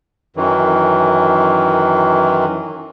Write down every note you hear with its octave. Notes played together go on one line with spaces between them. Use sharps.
F#2 D#3 E3